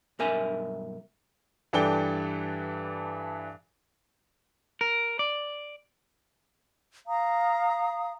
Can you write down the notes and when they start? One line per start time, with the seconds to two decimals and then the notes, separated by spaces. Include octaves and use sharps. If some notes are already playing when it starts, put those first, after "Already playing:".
0.19 B1 G2 A#4 E5 G#5
1.73 G2 E3 D4 A4 G5 G7
4.81 A#4
5.19 D5
7.07 F5 A#5 D#6